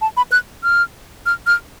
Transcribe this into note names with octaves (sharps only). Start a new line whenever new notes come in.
A5
B5
F#6
F6
F6
F6